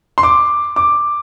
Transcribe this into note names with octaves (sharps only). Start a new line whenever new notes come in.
C6
D6
D6